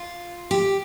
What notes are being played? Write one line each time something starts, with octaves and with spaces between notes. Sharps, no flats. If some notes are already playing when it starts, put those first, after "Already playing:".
Already playing: F4
G4